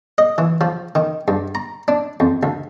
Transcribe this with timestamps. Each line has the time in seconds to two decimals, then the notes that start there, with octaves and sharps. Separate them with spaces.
0.18 D#5
0.38 E3
0.61 F3
0.95 D#3
1.28 G2
1.55 A#5
1.88 D4
2.20 F2
2.43 D2